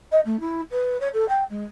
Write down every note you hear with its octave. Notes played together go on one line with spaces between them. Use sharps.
D#5
A3
E4
B4
C#5
A4
G5
G#3